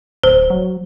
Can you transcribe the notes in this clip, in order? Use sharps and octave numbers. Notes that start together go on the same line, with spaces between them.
D1 C5
F#3